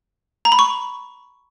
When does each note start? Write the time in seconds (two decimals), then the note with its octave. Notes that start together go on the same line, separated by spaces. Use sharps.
0.45 A#5
0.52 B5
0.59 C#6